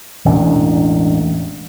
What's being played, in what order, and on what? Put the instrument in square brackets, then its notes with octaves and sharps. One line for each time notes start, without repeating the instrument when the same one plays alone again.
[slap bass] E1 A1 E2 D4